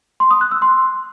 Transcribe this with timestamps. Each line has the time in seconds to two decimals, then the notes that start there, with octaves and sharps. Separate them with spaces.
0.20 C6
0.31 D#6
0.41 F#6
0.51 E6
0.62 C6